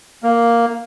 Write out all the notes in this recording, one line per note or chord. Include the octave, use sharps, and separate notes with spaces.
A#3